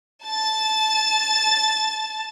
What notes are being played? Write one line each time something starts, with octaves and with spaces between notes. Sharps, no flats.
A5 A6